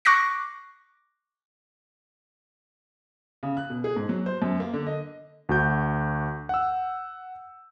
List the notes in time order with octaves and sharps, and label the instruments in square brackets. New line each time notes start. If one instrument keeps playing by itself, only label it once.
[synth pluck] C#6 D6 F#6 A#6 C7
[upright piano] C#3
F#6
B2
G#4
G#2
F#3
C5
F#2
A#3
D3
D#5
[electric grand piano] D2 F#4 G6
F#5 E6